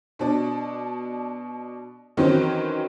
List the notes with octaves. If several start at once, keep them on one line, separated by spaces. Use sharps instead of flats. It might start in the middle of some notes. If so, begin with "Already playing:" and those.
B2 D4
D#3 E3 F#3 C4 C#4